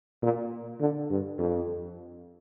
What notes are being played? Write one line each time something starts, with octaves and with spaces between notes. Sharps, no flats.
A#2
D3
G2
F2